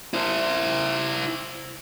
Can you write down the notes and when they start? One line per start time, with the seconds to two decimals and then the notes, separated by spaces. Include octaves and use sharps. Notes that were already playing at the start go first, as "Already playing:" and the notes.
0.14 E4 C5